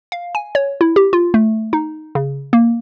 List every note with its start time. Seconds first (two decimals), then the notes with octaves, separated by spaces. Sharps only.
0.12 F5
0.35 G#5
0.55 C#5
0.81 E4
0.96 G4
1.13 F4
1.34 A3
1.73 D#4
2.15 C#3
2.53 A#3